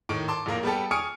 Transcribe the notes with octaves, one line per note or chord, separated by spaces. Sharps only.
A2 D#3 C#6 D7
A5 C6 D6
A#1 A2 A#3 A#4
G3 B3 G4 A4
G#5 C#6 D#6 F6 C#7 D7